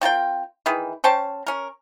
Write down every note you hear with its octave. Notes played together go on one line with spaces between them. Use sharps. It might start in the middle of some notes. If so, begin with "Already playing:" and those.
C4 F4 A#4 G5
D#3 E3 G#4 B4
C#4 C5 G5 A5
C#4 A#4